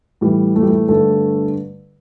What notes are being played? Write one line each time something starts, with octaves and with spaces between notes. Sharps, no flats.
A2 E3 G3
A3
G3
A3
G2 D3 A3 A4